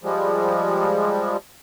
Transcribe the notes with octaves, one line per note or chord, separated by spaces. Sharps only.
F3 G3 G#3